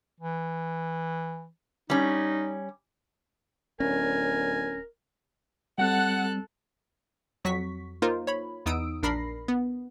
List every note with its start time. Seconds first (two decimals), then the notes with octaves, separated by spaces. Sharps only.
0.20 E3
1.90 G3 C#4 D#4
3.80 D1 C#4 A#4 G#5
5.78 G3 C4 A4 F#5 F#6
7.45 F2 F#3 F#4 C#6 B6
8.02 A#3 D#4 F4 A#4 C5
8.27 C#5 B5
8.66 E2 B3 D#4 D#6 E6 D7
9.03 A#1 D4 A#4 B5 A#6 C7
9.48 B3